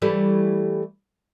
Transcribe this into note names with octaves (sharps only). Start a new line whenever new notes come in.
E3 G3 A3